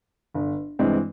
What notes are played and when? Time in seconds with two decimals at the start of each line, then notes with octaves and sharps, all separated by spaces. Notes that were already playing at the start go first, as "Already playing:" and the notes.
0.34 G1
0.79 G2 E3 G#3 C4